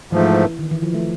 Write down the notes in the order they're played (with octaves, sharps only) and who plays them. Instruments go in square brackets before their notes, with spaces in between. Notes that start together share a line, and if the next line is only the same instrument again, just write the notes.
[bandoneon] G#2 F3 A3 [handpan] E3
[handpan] D#3
E3
F3
A3